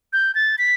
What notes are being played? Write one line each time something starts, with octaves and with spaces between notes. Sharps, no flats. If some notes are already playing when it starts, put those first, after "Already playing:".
G6
A6
B6